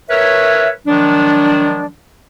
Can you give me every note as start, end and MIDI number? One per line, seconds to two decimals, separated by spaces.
0.09 0.69 70
0.09 0.69 71
0.09 0.69 73
0.09 0.69 76
0.87 1.87 51
0.87 1.87 53
0.87 1.87 54
0.87 1.87 56
0.87 1.87 62